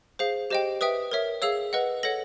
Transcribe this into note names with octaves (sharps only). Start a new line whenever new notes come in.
G#4 C5 F5
G4 C5 D#5 G5
B4 E5 G5 D#6
A#4 C#5 E5
G#4 C#5 F5 E6
B4 D#5 F#5
A4 C#5 F#5 A#6